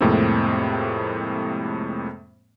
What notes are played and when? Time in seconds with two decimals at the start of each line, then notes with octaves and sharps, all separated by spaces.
0.01 F2 A2 C3 G#3 A#3 C4